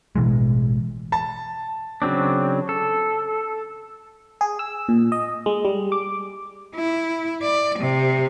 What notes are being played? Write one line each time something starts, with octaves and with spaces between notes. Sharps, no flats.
A1 B2 E3 G#3
A5
C#3 F#3 C4 D4
A4
G#4
E6
A#2
D#5
G#3
G3
D6
E4
D5
C3